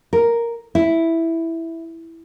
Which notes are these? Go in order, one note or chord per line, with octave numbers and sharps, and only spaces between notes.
A#4
E4